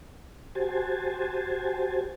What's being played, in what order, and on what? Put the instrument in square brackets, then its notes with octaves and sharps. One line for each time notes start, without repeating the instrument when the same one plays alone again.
[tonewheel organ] F#4 G4 C5 G#5 A5